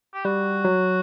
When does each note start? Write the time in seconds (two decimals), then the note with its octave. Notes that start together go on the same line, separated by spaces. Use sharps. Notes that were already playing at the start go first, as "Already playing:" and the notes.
0.14 G4
0.25 G3 F#4
0.65 F#3